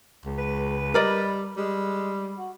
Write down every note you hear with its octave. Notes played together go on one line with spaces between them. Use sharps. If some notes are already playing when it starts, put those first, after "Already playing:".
C#2
B4
G3 A#4 D5 D#5
G3 G#3
F#4